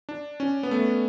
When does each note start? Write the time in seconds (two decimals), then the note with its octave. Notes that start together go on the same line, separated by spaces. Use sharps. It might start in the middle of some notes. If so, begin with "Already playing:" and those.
0.09 D4
0.40 C#4
0.63 B3
0.71 A3